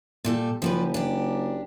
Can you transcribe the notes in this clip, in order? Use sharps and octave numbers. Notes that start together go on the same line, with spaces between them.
A#2 G3 A4
F#1 F3 G3 B4
D4 G4